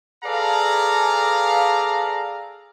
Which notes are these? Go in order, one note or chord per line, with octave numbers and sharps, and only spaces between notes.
G#4 A4 B4 D5 F5 A#5